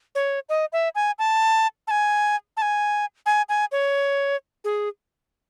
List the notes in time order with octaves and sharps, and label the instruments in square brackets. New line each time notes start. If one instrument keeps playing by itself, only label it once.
[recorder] C#5
D#5
E5
G#5
A5
A5
G#5
A5
G#5
G#5
G#5
C#5
G#4